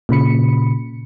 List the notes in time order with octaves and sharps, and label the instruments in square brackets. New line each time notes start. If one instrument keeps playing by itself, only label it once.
[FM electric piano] A#2 C#3 B5 C#7